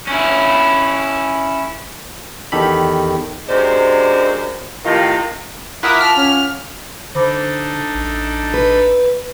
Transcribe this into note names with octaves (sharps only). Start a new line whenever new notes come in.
C#4 E4
E2 D#3 G4 A4 B5
F#2 C3 G#3 D4 C5
A2 C3 D#3 F4
E4 F4 A#4 F#5 D6 D#6 B6
A5 F6
C#4
D3 D4 D#4 A4 C5 B5 D6
A1
B4